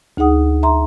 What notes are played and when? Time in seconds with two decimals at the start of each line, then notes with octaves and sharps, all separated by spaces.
0.17 D2 D#4 G#4 F#5 D#6
0.63 E5 A#5 C6